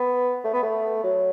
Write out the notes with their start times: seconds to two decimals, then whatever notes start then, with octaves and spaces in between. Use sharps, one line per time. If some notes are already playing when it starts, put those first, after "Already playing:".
Already playing: B3
0.44 A3
0.53 B3
0.62 A3
1.04 F#3